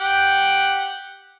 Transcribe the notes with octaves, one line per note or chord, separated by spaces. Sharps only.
G4 F#5 G5